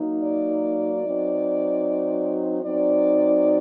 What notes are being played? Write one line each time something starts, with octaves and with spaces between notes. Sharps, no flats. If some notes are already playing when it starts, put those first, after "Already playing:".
Already playing: F#3 A#3 D#4
D5
F#3 C4 D#4
F#3 C4 D#4 D5